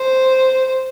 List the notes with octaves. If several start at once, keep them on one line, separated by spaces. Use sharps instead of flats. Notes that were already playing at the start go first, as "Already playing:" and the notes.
Already playing: C5